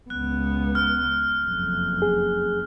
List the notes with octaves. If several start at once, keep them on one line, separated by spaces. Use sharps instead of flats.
C#2 B3 F#6
F6
F#1 F2
G#4